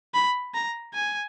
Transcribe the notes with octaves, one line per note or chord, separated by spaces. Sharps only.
B5
A#5
G#5